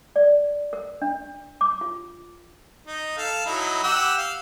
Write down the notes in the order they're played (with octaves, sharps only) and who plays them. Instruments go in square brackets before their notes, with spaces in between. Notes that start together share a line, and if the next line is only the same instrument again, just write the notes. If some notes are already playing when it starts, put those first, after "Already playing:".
[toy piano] D5
A#4
D4
D6
F4
[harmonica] D#4
A4 F5
F#3 D#4 E4
G4 F#5 E6
F5